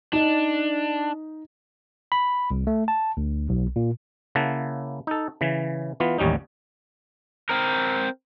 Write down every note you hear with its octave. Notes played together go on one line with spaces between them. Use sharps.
D4 D#4
B5
C2
A3
A5
D2
B1
A#2
C#3 A#3 E4 F#5 A5
D#4 A4
C#3 E3
E3 B3 F4
A1 D#2 G3 C#4 D#4
C4 A#4